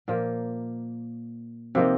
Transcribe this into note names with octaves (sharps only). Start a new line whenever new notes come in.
A#2 F3 A#3
C3 F3 A#3 D#4